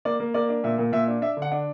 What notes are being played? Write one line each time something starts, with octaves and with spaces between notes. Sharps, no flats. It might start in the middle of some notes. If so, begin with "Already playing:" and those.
A#3 D5
A#3
A#3 D5
D4
A#2 E5
A#2
A#2 E5
D4
D4 E5
D3
F#5
D4